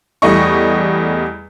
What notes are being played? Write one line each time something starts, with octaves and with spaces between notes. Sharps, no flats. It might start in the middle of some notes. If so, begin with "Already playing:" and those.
E2 G3 A3 D#5 C#6